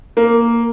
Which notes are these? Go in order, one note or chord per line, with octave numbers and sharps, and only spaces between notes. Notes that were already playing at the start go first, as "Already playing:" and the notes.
A#3